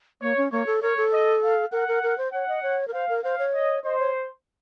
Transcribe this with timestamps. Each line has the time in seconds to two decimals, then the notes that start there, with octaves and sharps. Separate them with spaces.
0.22 A#3 C#5
0.37 C#4
0.52 A#3 C#5
0.66 A4
0.82 A#4 C#5
0.97 A4
1.13 D#5
1.43 F5
1.72 A#4 F#5
1.88 A#4
2.03 A#4
2.18 C5
2.33 C#5 F#5
2.48 D#5
2.63 C#5
2.88 A#4
2.93 C5 F5
3.09 A#4
3.24 C5 F5
3.39 C#5
3.54 D#5
3.84 C5 D#5
3.99 C#5